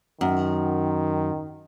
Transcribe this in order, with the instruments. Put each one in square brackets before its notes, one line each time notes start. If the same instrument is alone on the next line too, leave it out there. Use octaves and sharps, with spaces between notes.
[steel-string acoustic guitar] F#2 [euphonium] D#3